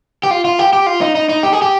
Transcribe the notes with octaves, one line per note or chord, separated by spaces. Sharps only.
G4
F4
F4
G4
G4
F4
D#4
D#4
D#4
G4
G#4
G4